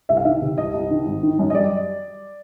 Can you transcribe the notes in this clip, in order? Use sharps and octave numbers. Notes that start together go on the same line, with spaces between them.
C2 E5
F5
D#3 E5
C3
C2 D#5
C2
D#3
G#1
D#3
F#2
D#5
G3 D5